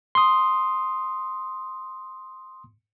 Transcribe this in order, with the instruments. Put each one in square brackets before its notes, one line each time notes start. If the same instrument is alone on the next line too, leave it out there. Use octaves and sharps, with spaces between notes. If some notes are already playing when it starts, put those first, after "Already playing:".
[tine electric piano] C6 D#6